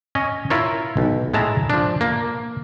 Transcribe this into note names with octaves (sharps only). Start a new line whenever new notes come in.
C#4 C#5 D#5
E4 F4 A#4 C#5
B1
A2 G#3 E4 A5 A#5
F3 D4
A#3